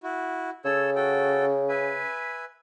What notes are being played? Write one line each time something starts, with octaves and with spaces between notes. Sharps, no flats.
E4 F#4
C#3 A4 C#5 E6
F#4 A4 G5
B4 E5 G#5